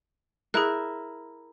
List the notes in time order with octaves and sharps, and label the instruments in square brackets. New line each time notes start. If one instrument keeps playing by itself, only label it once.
[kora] E4 A#4 [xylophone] G#4 F#6